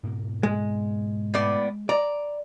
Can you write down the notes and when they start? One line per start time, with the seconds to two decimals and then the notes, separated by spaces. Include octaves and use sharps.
0.03 G#2 B2 A#3
0.43 G#3
1.34 A2 B3 D5
1.89 D5 A#5